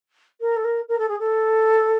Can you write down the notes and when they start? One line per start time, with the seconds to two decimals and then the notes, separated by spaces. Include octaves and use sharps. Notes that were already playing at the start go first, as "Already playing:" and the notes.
0.40 A#4
0.56 A4
0.64 A#4
0.88 A#4
0.98 A4
1.08 G#4
1.19 A4